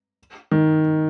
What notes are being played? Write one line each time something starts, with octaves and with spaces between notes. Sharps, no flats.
D#3